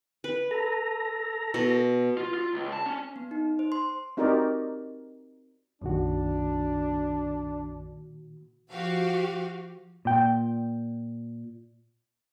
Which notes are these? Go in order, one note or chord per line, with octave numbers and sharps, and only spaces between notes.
B4
A4 A#5
B2
F4
F4
C#2
A5
C#4
B3
D#4
C5
C6
C4 D#4 F#4 G4 A#4 D5
B1 F#2 A#2 D#3 D4 F#4
F3 F#4 G4 F5
A#2 G5